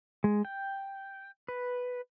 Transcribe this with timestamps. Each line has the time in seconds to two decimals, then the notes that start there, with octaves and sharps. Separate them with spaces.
0.24 G#3
0.45 G5
1.48 B4